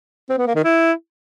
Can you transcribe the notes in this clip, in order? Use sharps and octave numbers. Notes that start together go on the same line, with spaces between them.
C4
B3
A#3
D#3
E4